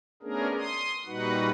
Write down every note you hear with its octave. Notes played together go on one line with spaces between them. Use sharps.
A3 B3 C#4 D4 G#4 A#4
C6 D#6
A#2 G3 D#4 F#4 B4 F#5